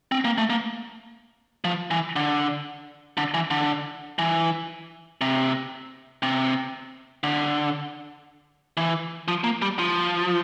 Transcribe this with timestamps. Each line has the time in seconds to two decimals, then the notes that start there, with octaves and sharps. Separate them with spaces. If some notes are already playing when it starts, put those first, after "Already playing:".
0.12 C4
0.25 A#3
0.38 A3
0.50 A#3
1.64 F3
1.91 E3
2.16 D3
3.17 D3
3.34 E3
3.51 D3
4.19 E3
5.21 C3
6.23 C3
7.23 D3
8.77 E3
9.28 F3
9.44 A#3
9.62 G3
9.79 F3